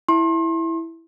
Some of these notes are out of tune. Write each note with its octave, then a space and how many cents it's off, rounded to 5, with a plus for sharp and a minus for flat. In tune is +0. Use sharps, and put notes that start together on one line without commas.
E4 +0 C6 +35